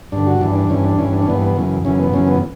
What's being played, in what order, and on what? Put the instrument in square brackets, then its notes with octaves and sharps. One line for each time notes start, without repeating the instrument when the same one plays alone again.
[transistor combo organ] G2 D3 D4
F#4
G2 E3 D4
D4
G2 E3 C#4
D4
G2 E3 C#4
D4
C#4
G2 E3 B3
B3
F#2 C#3 E3
F#2 C#3 E3 C#4
B3
F#2 C#3 E3 C#4
B3